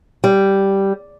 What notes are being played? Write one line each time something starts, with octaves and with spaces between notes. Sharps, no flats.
G3